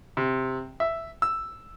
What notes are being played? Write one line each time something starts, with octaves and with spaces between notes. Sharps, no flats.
C3
E5
E6